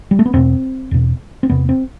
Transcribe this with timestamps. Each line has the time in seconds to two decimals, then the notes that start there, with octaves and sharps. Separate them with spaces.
0.11 G3
0.19 A3
0.26 B3
0.33 E2 B2 C4
0.91 E2 B2
1.43 C4
1.49 E2 C3 B3
1.69 C4